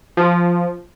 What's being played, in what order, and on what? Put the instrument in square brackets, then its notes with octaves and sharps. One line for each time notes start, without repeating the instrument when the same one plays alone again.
[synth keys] F3